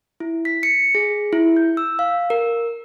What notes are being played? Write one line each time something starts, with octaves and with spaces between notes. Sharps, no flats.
E4
B6
C#7
G#4
E4
G6
E6
F5
A#4